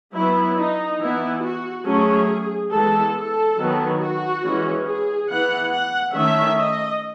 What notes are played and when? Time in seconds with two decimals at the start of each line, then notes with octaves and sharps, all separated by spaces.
0.14 F#3 B3 E4
0.57 D#4
1.00 E3 B3 E4
1.42 F#4
1.86 F#3 A3 C#4 G#4
2.71 E3 G#3 B3 A4
3.14 A4
3.58 D#3 F#3 B3
4.00 F#4
4.43 E3 G#3 C#4
4.86 G#4
5.29 E3 B3 F#5
5.72 F#5
6.14 D#3 A3 C#4 E5
6.57 D#5